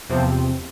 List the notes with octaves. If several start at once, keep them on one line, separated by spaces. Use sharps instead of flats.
E2 C3 F3 C4